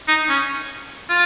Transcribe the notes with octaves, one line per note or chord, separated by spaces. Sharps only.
D#4
C#4
F4